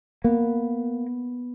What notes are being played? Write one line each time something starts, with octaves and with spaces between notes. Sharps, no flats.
A#3 B3